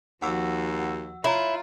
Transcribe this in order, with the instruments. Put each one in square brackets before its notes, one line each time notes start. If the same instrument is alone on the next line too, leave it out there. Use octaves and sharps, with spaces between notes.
[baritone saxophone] D#2 [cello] F3 F#4 [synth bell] F#5 E6
[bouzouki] E4 [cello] F4 [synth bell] C#5 A#5